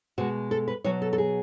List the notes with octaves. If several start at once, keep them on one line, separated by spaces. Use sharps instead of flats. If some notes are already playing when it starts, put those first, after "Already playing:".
B2 G#3 F#4
A4
B4
B2 F#3 C#5
A4
A4
G#4